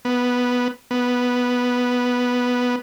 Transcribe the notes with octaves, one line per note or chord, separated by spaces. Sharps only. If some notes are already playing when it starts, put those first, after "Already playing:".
B3
B3